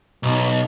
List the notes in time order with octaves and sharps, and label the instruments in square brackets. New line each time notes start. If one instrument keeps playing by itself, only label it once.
[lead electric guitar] B1